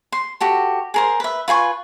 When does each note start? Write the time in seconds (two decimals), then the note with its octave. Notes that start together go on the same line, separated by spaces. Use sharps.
0.12 C6
0.40 F#4 G4 A4
0.94 G#4 A#4 C5
1.20 B4 E5
1.48 F4 B4 G#5 C#6